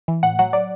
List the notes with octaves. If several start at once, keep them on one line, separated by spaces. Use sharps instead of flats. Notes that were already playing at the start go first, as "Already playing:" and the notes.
E3
A2 F#5
F#3 F#5
F#3 D5